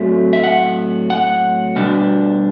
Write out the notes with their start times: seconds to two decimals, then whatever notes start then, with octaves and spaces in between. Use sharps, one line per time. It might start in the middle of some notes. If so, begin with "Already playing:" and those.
Already playing: A2 F#3 A3 C4 E5
0.33 E5
0.44 F#5
1.10 F#5
1.76 B2 G3 D4